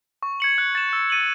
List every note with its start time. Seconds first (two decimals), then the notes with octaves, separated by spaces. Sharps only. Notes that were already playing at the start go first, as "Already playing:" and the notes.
0.23 C#6
0.40 G#6 C#7 F#7
0.58 F#6
0.75 A6 E7
0.93 E6
1.10 A6 D#7 F#7